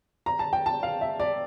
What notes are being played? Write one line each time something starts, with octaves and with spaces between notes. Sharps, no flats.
A#5
A5
G5
A5
F5
E5
D5